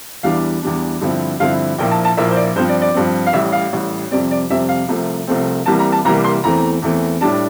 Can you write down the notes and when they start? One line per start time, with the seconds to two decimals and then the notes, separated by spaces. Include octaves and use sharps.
0.23 E2 E3 G3 D4 F5
0.62 E2 E3 G3 D4
1.01 G2 D3 F3 C4 E4
1.40 G2 D3 F3 C4 E4 F5
1.79 A#1 A#2 F3 A#3 E4 G5
1.91 A5
2.05 A5
2.17 A#1 A#2 F3 A#3 E4 E5
2.31 C5
2.36 D5
2.56 G2 F3 C4 C5
2.69 D5
2.82 D5
2.94 G2 F3 C4
3.26 F5
3.33 A1 A2 G3 E5
3.52 F5
3.72 A1 A2 G3
4.11 F2 C3 G3 C4 D5
4.31 D5
4.50 F2 C3 G3 C4 E5
4.69 F5
4.89 C2 C3 F3 A3 C4
5.27 C2 C3 F3 A3 C4
5.66 C2 C3 E3 G3 A#3 A5
5.79 A#5
5.92 A5
6.05 C2 C3 E3 G3 A#3 A#5
6.24 C6
6.44 E2 E3 A3 C4 A#5
6.82 E2 E3 A3 C4
7.21 A2 G3 D4 A5